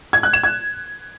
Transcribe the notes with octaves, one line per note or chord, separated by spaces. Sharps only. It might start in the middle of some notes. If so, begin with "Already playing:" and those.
G#6
F#6
E7
G#6